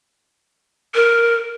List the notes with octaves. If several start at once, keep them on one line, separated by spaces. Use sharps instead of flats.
A#4